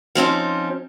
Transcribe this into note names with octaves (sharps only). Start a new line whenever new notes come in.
F3 C4 C#4 D#4